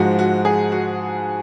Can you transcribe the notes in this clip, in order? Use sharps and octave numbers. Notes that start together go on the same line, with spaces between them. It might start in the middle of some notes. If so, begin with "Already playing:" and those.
Already playing: G#2 F3 G#3 F#4
F#4
G#4
F#4